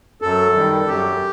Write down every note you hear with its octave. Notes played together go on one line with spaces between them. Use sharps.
F#2 A4
D#3 G3
F#2 G4